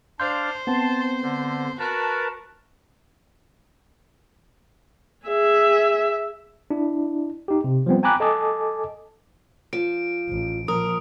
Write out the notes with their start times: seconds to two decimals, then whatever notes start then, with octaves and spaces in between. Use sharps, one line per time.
0.20 D4 C5 F5 C6 G6
0.67 B3 C4 A5 C6
1.23 D3
1.79 F#4 A#4 B4 A5
5.26 G#4 E5
6.71 D4 E4
7.48 D#4 G4
7.64 C3
7.86 F3 G3 B3 C4
8.03 G5 G#5 A#5 B5 D6 F#6
8.20 A4 D#5 G#5 A5 D6 D#6
9.73 F3 D7
10.29 A1
10.68 A#2 F3 A#4 D#6